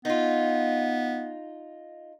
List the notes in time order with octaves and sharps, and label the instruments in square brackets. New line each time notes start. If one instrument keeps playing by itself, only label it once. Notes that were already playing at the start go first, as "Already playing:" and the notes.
[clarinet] B3 [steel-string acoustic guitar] D#4 F4